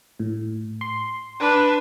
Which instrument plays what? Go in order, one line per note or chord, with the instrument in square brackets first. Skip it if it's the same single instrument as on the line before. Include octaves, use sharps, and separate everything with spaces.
[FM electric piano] A2
C6
[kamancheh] D4 B4